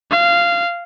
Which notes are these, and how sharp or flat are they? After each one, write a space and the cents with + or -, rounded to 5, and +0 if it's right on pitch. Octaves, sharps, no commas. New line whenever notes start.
F5 -15